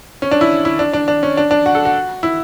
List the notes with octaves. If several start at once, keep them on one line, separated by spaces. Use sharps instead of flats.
C#4
D4
E4
E4
D4
D4
D4
C#4
D4
D4
F#4
A4
F#4
E4